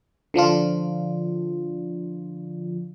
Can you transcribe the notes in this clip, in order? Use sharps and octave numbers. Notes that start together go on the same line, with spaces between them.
D3 F3 D4 F4